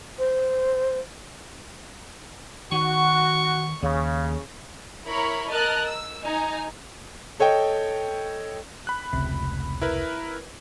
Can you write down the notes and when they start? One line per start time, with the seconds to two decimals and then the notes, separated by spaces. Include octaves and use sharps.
0.19 C5
2.72 D#3 F#4 C#6
3.82 D#2 C#3
5.07 E4 A#4 C#5 A#5 B5 C#6
5.51 A#4 D#5 A5 F6 F#6 A6
5.83 E6
6.21 D#4 G#5 A#5
7.40 A4 C#5 D#5 G5
8.87 B5 F#6
9.13 F1 C#2 C3
9.81 E4 A#4 B4